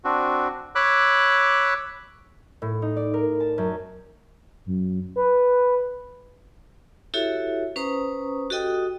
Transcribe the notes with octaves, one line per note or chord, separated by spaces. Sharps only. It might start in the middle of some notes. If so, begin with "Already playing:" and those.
C4 D4 F#4
C#5 B5 D6 E6 F#6
A2
D#4
D5
A#4
A5
F#2
F#2
B4
E4 F#4 G4 A4 C#5 E5
C#4 B4 C5 A#5 C#6 D#6
F#4 G4 A4 D#5 G5 D#6